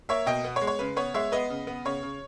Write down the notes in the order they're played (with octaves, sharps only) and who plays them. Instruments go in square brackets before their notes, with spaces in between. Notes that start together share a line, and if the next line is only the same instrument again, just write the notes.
[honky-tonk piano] A#3 C#5 E5
B2 D#5 G5
B3
C#5
G#3
C#5
C#3 B4
B3 C#5
G#3 C#5 E5
B3 B4 D#5
C#3
B3
C#3 C#5
C#3